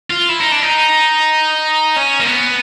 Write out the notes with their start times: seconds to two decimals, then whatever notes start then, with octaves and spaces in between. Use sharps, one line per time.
0.10 F4
0.29 E4
0.40 D#4
0.52 D4
0.62 D#4
1.96 C#4
2.19 A#3
2.25 B3